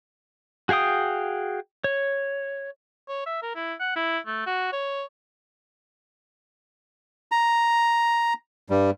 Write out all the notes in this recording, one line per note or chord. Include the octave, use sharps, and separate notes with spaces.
F#4 G#4 F5 G5 D#6
C#5
C#5
E5
A#4
E4
F#5
E4
A3
F#4
C#5
A#5
G2 G3